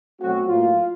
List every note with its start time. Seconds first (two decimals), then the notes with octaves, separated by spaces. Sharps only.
0.21 B2 F#3 A3 C4 F#4
0.48 A2 F#3 A#3 F4